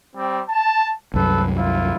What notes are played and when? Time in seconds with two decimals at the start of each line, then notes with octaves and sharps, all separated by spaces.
0.14 G3 C4
0.49 A5
1.14 C2 F#2 A4 B4
1.56 E4 F4